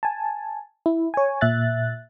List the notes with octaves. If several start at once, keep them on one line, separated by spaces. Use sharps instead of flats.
G#5 A5
E4
C#5 G#5
A#2 E5 F#6 A6